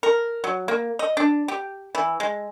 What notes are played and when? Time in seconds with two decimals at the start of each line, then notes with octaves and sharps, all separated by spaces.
0.03 A#4
0.44 F#3
0.68 A#3
0.99 D#5
1.17 D4
1.48 G4
1.95 E3
2.20 G#3